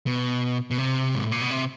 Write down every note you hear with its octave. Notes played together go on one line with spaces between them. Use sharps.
B2
B2
C3
G#2
A2
A#2
B2
C3